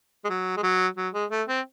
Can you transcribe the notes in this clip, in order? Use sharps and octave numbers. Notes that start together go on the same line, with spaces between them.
G#3
F#3
G#3
F#3
F#3
G#3
A3
C4